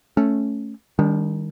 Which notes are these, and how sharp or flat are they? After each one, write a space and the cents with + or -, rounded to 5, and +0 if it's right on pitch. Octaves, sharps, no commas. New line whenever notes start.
A3 +0 C#4 +0
D#3 +5 G3 +35 D4 -35